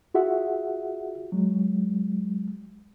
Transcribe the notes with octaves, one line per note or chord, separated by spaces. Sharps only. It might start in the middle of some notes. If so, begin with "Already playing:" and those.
F4 F#4 G#4 E5 F#5
F#3 G#3